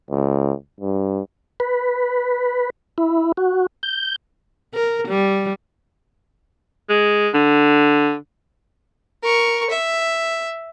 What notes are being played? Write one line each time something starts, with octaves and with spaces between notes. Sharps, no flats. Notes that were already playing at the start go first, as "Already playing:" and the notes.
C#2
G2
B4
E4
F#4
G6
A#4
G3
G#3
D3
A#4 C#6
E5